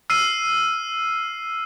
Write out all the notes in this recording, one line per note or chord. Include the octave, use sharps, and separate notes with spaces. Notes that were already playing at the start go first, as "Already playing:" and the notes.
E6 F6 C7 D#7